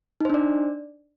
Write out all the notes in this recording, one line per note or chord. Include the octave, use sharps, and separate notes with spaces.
D4 D#4 C5 D5